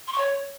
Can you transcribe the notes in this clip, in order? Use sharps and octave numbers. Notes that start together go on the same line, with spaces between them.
C6
C#6
C#5